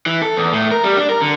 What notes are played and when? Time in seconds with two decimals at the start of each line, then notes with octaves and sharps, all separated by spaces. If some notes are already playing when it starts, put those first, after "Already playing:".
0.06 E3
0.22 A4
0.37 E2
0.53 A2
0.71 A#4
0.84 G3
0.97 D4
1.09 A#4
1.22 D3